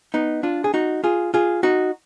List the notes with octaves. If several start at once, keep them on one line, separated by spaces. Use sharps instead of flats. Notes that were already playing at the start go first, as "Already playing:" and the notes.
B3 D#4
D4 F4
G#4
D#4 F#4
F4 G#4
F4 G#4
D#4 F#4